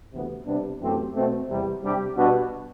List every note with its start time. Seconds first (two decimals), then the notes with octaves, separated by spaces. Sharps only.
0.12 D2 C3 E3 B3
0.46 C3 G3 B3 D4
0.80 F#2 E3 A3 C4 G4
1.14 B2 A3 C4
1.49 E2 C3 G3
1.82 C3 G3 D4 G4
2.16 B2 G3 B3 D4 F#4